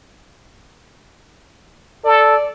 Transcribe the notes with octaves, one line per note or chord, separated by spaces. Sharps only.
A4 D5